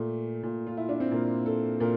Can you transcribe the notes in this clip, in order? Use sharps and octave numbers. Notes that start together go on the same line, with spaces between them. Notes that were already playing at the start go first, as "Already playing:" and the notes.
Already playing: A#2 A3
A#2
F4
E4
D4
C4
A#2 A#3
A4
A#2 A#4